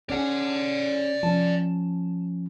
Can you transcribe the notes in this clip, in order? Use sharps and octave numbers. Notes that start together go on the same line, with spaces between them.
C#4 G#4 D5 F#5
F3 C#4 A5